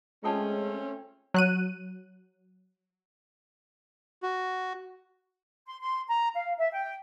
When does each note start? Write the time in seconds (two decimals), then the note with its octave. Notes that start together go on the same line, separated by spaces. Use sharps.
0.24 G#3 A3 C4 C#4 F4 A4 A5
1.34 F#3 F#6 D#7
4.23 F#4
5.67 C6
5.80 C6
6.08 A#5
6.34 F5
6.58 E5
6.70 G5